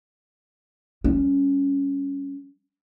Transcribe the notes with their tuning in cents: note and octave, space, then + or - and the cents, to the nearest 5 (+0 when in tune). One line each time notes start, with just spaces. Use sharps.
G3 +0 C#4 +0